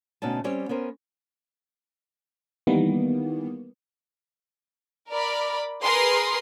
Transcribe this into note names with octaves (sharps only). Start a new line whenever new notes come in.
D2 B2 C#4 D#4 A5
G3 C4 C#4 G4 C#5
B3 C#4 A#4 C5
D#3 E3 G3 A#3 B3
A#4 D5 B5
G#4 A#4 B4 C6